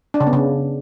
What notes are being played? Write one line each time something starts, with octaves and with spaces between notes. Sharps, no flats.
D4
C#3
B3
C#3